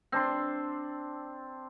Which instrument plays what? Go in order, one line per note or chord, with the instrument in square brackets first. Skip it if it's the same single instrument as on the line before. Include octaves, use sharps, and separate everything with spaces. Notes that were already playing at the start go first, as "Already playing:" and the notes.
[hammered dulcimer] C4 D4 C6